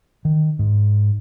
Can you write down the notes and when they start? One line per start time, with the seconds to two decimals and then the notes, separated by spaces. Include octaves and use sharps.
0.25 D#3
0.59 G#2